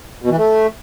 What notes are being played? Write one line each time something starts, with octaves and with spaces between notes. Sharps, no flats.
B2
E3
A3